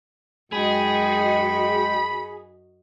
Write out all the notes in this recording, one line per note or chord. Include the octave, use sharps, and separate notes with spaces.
F#2 G#3 D#4 F#4 G#4 G5 B5